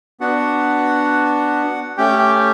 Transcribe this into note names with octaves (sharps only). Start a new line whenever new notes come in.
B3 D4 F#4 F#5
A3 C#4 G4 G5
G5